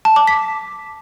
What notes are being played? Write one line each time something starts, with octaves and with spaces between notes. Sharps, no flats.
A5
D6
B6